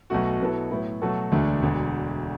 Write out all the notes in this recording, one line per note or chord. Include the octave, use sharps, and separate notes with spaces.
B1 B2 A3 F#4
B2 F#3 B3 E4 A4
A2 F#3 B3 E4
B2 F#3 A3 F#4 A4
E1 D2 D3 A3 D4
E1 D2 D3